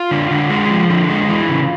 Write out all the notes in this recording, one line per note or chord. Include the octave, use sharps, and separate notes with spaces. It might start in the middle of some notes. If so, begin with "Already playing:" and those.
Already playing: F4
D3
D3
G#3
F3
D3
G#3
E3
C#3